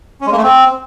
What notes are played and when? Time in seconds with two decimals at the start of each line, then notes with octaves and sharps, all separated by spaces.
0.21 C#4
0.27 G#3
0.32 A#3
0.38 A3
0.43 C4